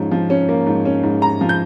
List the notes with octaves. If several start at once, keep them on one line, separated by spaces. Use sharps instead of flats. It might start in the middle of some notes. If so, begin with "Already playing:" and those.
Already playing: G#2 F3 C#4
F3
C#4
A#3
G#2
C#4
G#2
G#2 A#5
F3
G6